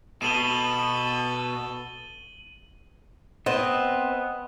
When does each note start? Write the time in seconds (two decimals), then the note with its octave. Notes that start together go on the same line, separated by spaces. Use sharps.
0.22 B2 A4 D#7 F#7 G7
3.46 B3 C4 D#5